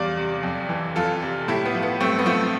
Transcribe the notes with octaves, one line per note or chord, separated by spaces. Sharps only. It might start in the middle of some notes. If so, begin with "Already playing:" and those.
Already playing: E2 G3 D5 F5
C3
F2
E3
F2 F4 A4
C3
A2 E4 G4
B3
F3
B3
G2 A3 C4
B3
F3 A3 C4